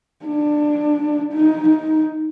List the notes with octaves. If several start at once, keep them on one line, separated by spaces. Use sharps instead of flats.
D4
D#4
D#4